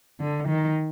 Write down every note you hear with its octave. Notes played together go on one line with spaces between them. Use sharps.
D3
D#3